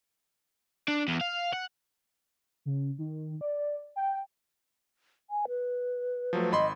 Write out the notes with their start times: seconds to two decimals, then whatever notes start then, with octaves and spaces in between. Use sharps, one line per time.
0.88 D4
1.08 E2
1.21 F5
1.53 F#5
2.65 C#3
2.98 D#3
3.41 D5
3.96 G5
5.30 G#5
5.48 B4
6.33 F3 F#3 A3
6.52 G#1 D#5 B5 C6